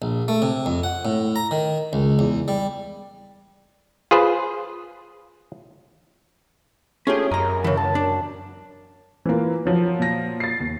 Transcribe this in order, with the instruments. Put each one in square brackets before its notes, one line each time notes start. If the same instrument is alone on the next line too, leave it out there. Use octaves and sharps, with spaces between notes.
[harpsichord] A#1
A3
C3
F2
F#5
A2
A#5
D#3
C#2
E2
G3
[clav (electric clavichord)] F4 G#4 B4 C5
[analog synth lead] A3 [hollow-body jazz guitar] C#4 F4 G4 [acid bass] G#4
[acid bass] F#2 [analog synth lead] A#4 [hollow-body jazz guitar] D#5 A#5
[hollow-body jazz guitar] C#3 E3
[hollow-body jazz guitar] C#2 [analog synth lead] A5
[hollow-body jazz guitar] D4
[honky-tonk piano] E3 A#3 [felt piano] F4 B4
[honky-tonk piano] F3 F#3
[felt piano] A#2 A#6
[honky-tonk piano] A6 C7
[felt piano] D#2